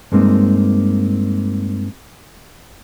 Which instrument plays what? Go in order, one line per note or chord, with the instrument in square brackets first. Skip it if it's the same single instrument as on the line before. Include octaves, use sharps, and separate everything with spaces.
[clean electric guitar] G2 G#3 A#3 C4 D#4